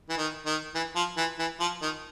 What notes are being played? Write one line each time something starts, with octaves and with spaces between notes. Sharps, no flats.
E3
D#3
D#3
E3
F3
E3
E3
F3
D#3